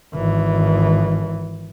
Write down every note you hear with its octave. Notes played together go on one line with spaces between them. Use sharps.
G#1 E3